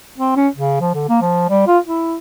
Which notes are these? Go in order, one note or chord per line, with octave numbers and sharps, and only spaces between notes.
C4
C#4
C#3
F3
D3
A#3
F3
G3
F4
E4